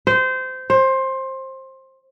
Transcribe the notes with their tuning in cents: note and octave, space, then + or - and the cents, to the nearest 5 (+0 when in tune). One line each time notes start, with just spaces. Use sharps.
C5 -20
C5 +20